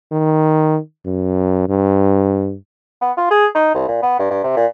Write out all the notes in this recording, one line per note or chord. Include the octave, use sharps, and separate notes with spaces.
D#3
F#2
G2
B3
F4
G#4
D#4
C2
A#2
B3
G2
G2
C3
A#2